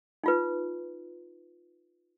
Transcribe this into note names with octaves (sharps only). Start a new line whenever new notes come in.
D#4 F4 B4